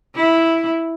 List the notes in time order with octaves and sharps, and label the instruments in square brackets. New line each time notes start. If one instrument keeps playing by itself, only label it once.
[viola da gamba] E4